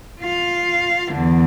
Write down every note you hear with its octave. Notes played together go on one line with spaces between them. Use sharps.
F4 F5
E2 D3